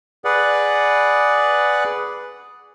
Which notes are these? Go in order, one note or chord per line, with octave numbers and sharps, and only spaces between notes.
G#4 B4 D5 F#5